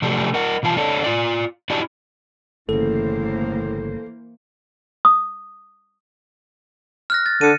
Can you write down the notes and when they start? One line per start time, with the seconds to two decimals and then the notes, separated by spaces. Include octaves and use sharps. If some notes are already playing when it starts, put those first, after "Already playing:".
0.02 C3 F3 F#3 A3 D4 G4
0.34 A#4 D#5 F#5
0.63 B2 E3 F4 A5
0.77 D4 A4 C#5 D#5
1.04 F4 D5
1.70 D4 E4 F#4 G4 D5 D#5
2.69 G1 A2 C#3 E3 A#3 A4 C5
5.05 D#6
7.10 F6 F#6 A#6
7.26 A6
7.41 D3 C#7 D#7